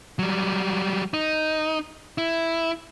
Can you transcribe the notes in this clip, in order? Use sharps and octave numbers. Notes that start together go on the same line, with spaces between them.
F#3 G3
D#4
E4